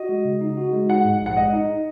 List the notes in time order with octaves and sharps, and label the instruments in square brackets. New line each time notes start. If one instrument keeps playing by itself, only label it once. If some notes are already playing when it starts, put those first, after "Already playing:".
Already playing: [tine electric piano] F#4 [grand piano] D#5
[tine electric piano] G#3
C#3
D#4
F#4
G#3
[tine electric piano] D#4 [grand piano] F#5
[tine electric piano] G#2
A#1
[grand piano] F#5
[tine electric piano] G#3 [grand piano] D#5
[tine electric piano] D#4